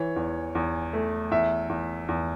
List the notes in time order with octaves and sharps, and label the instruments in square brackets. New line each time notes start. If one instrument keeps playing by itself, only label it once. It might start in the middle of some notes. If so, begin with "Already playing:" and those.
Already playing: [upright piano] E3 [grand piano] C#5
[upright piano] E2
E2
A3
[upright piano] E2 [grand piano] E5
[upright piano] E2
E2